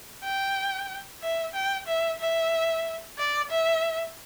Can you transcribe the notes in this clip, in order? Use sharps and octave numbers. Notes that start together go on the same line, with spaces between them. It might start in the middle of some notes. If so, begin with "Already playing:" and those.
G5
E5
G5
E5
E5
D5
E5